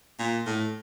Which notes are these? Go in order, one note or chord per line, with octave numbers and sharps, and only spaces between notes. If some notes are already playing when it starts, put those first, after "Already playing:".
A#2
A2